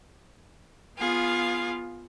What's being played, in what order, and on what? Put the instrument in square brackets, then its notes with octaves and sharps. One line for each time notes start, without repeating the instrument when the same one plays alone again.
[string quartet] B3 F4 G#4 F5